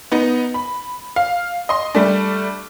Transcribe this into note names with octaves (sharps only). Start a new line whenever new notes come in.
B3 D#4
B5
F5
D#5 C6
G3 A3 D4